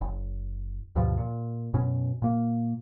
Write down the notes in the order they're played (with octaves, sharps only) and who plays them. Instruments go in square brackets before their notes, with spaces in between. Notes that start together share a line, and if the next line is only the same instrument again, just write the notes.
[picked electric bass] F#1
D2 G2 B2 F3
A#2
F#2 B2 C#4
A#2 A#3